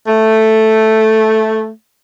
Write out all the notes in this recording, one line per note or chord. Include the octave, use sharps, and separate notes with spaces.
A3